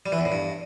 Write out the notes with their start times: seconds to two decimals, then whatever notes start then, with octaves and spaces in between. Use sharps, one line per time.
0.06 G3
0.12 E3
0.19 E2
0.25 A2
0.32 G2